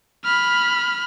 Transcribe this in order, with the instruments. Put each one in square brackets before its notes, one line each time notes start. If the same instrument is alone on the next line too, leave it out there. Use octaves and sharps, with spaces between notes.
[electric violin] B5 F6